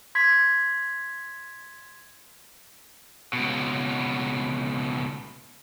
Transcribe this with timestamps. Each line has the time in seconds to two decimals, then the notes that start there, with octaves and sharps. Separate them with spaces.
0.15 C6 G#6 B6
3.33 C#2 B2